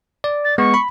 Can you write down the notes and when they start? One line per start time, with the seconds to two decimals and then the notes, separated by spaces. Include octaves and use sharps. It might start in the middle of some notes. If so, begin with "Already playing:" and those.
0.24 D5
0.44 A6
0.58 G#3 B3 C#6
0.74 B5